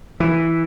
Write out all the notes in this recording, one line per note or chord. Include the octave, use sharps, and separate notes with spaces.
E3